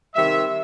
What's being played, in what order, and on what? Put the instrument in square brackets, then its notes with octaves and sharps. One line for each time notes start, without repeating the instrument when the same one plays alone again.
[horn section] C3 D#3 G3 E5